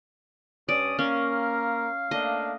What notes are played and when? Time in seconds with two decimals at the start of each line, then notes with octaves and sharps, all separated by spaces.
0.69 G2 C#4 D5 D#6
0.99 A#3 C#4 A#4 F5
2.11 A3 A#3 D4 D#5